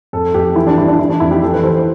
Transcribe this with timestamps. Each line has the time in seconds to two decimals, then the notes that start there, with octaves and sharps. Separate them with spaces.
0.13 F2 A4
0.34 F2 G4
0.56 E3 E4
0.67 D4
0.78 G2 E4
0.88 D4
0.99 E3 E4
1.10 D4
1.20 F2 E4
1.31 G4
1.42 E3 A4
1.53 B4
1.63 E3 C5